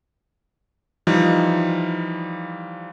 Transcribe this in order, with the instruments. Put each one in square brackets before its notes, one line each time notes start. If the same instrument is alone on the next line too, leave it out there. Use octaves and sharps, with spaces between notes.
[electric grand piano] E3 F3 G3 D#4